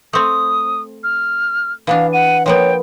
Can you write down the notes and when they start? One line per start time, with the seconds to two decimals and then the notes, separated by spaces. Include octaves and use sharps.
0.13 A3 C4 D#6
1.04 F6
1.87 E3 B3 D4 F5
2.13 F#5 D#7
2.46 F3 A#3 B3 C#5 G5